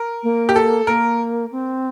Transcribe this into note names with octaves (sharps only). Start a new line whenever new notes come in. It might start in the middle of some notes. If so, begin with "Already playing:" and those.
Already playing: A#4
A#3
G4
A4
A#3 A#4
C4